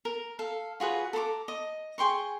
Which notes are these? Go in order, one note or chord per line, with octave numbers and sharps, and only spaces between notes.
A#4
A4 F5
F4 F#4 G#4 B4
A4 A#5 C6 D6
D#5
G#4 G5 C6 C#6